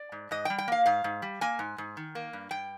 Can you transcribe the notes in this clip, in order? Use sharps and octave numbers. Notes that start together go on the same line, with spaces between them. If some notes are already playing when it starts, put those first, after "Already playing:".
Already playing: D5
G#2
G#2 D#5
G5
G3
G5
A#3 F5
G#2 F5
G#2
G3
A#3 G#5
G#2
G#2
D#3
A#3
G2
G2 G5